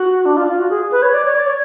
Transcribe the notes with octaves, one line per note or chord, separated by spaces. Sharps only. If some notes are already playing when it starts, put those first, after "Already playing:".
Already playing: F#4
D4
F4
F4
F#4
G#4
B4
C#5
D5
C#5
D5
C#5